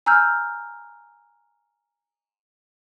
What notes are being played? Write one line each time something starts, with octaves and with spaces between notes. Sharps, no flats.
G#5 A#5 E6 F6 G6